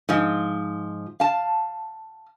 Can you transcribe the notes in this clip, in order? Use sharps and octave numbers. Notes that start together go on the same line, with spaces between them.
G#2 F3
F5 A5